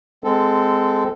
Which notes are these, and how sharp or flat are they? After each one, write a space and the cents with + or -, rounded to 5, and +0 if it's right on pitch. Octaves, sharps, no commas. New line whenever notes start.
G#3 +0 C4 -25 A4 +0